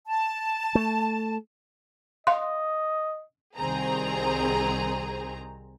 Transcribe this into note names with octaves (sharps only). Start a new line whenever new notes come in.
A5
A3
D#5 F5 C6
C2 D#3 C4 G#4 A#5